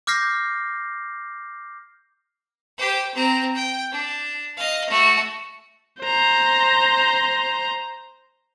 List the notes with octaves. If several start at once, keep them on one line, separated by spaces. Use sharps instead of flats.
D6 F6 G6 A#6 C7
G4 C5
C4 A#5
G5
D4
D#5 F5
A3 F#4
C5 A#5